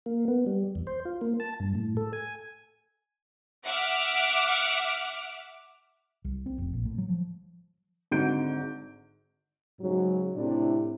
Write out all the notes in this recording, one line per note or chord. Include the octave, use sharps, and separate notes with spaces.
A#3
B3
G3
E2
C5
F4
A#3
A5
G2
A2
A4
G#5
E5 F#5 D6 F6
C2
C4
F1
A#1
A2
F#3
F3
G#1 G#2 D3 F#4 G6 D7
G#2 C#3 F#3
A2 C3 D4 E4